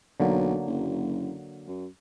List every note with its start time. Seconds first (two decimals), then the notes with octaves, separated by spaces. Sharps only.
0.20 B1 D3 F#3 A#3
0.66 F#1
1.67 F#2